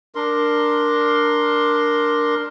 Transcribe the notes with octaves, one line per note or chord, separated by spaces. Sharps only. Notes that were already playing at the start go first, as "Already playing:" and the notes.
D4 A#4 C6